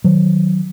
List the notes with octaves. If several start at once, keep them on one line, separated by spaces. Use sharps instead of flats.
D#3 F#3